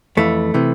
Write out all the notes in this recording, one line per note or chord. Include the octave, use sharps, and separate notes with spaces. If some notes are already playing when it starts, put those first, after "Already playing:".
F2 E3 A3
C3 E3